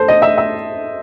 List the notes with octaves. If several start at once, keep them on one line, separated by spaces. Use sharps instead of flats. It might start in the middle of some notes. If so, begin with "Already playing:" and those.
Already playing: A4 C5
D#5
E5
E5